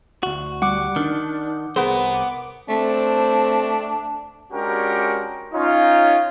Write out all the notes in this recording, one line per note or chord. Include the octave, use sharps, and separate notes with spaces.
D2 F#4
G3 F#5 D6
D#3 D4
C2 B3 G#4 A#4 C5
D6
A3 C4 D4
G#3 C#4 D4 F#4 G4 A#4
C#4 D#4 F4